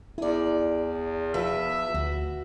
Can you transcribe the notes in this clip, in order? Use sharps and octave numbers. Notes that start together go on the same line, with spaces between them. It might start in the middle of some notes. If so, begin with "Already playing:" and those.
E2 E4 G#4 D5
F3 B4 E5
D2 F#4